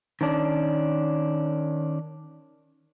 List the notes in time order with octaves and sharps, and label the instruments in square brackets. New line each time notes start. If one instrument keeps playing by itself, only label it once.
[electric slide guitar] D#3 C#4 D4